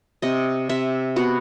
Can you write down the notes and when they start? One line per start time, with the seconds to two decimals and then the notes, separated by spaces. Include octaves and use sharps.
0.22 C3 D#5
0.69 C3 E5
1.16 B3 F#4